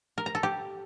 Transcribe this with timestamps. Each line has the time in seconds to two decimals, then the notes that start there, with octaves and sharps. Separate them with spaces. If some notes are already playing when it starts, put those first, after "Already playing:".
0.18 A#4
0.26 A#5
0.35 A4
0.43 G4